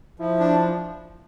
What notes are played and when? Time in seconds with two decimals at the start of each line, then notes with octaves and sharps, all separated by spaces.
0.19 F3 E4
0.40 D4